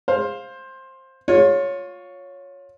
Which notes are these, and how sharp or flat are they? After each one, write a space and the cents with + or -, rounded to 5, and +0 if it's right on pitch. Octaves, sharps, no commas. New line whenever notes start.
C5 +15 F5 +5
F4 +25 C#5 +0